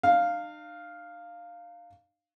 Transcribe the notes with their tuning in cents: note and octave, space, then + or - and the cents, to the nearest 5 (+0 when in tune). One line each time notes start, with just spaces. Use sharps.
D#4 -45 F5 +0